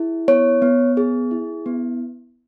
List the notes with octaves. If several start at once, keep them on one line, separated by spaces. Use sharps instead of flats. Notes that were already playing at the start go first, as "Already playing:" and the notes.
Already playing: E4 G#4
B3 C#5
B3
G#4
E4
B3